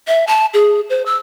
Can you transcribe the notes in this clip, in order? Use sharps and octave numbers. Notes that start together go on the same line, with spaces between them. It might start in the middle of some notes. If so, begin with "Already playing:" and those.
E5
A5
G#4
C5
E6